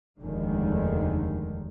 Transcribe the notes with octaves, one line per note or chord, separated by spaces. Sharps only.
F1 D#2 D3 D#3 G#3